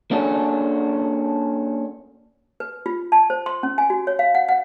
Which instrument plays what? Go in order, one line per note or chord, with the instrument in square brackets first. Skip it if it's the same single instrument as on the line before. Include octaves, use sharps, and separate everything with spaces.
[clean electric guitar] A#3 C#4 D4 F#4 G#4 A4
[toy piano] B4
F4
A5
C5
C6
C#4
G#5
F#4
C#5
F5
F#5
F#5